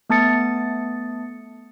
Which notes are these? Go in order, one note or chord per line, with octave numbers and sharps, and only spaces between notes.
A3 B3 A5 D#6 A6 C#7